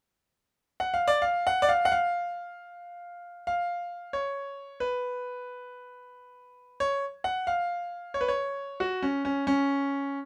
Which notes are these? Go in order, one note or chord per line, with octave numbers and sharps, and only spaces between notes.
F#5
F5
D5
F5
F#5
D5
F5
F#5
F5
F5
C#5
B4
C#5
F#5
F5
C#5
B4
C#5
F#4
C#4
C#4
C#4